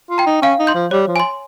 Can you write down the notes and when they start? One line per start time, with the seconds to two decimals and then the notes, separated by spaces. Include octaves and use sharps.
0.10 F4
0.18 G5 A#5
0.27 D#4
0.42 C#4 F5
0.59 D#4
0.67 C6 G6
0.75 F3
0.91 G3 C#5
1.08 F3
1.16 G#5 C6